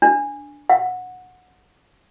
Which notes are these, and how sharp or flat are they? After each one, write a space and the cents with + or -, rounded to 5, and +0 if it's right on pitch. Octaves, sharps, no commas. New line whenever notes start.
D4 +0
F#5 -15